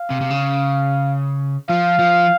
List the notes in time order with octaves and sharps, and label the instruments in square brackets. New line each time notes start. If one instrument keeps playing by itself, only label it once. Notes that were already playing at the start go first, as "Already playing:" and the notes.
Already playing: [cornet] F5
[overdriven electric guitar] C3
C3
C#3
[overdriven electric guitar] F3 [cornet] F5
[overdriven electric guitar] F3